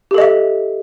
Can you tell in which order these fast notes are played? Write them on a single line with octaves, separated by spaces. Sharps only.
G4 A4 D#5 E5